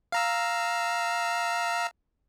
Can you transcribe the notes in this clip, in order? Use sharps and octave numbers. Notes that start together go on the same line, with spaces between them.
F5 A#5 E6